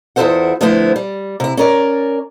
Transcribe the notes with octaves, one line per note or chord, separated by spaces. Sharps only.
E2 E4 F4 A4 C5 F#5
D3 F3 A3 B3 E4 C5
G3
C3 E4
C#4 A#4 D5